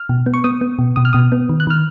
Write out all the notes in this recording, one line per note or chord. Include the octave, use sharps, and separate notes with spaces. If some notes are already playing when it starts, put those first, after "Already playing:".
Already playing: F6
B2
B3
C#6
B3 D#6
B3
B2
B2 D#6
F6
B2 D#6
B3
D#3
F#6
D#3 F6